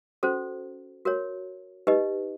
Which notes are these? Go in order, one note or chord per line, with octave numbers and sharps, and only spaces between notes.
C#4 F#4 A4 C5
F#4 A#4 C#5
D#4 G4 B4 D#5